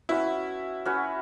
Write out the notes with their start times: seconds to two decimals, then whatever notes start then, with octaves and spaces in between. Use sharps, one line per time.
0.09 C#4 E4 F#4 B4
0.85 C#4 F#4 B4